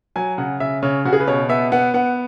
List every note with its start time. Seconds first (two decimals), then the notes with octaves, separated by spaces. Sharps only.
0.16 F#3 G#5
0.38 C#3 F#5
0.60 C#3 E5
0.83 C#3 C#5
1.05 C#3 F#4
1.13 G#4
1.20 B4
1.28 B2 C#5
1.49 B3 E5
1.72 B3 F#5
1.94 B3 F#5